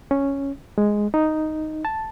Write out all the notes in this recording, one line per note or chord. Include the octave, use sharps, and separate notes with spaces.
C#4
G#3
D#4
A5